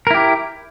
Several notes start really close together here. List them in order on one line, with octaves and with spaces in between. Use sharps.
A#4 E4 G4